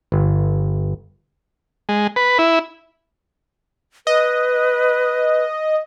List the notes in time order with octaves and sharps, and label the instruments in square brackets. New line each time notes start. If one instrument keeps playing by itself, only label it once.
[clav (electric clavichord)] G1
[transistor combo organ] G#3
B4
E4
[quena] B4 [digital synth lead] D#5